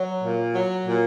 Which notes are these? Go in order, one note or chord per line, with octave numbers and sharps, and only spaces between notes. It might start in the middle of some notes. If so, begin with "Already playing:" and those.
Already playing: F#3
A#2
F#3
A#2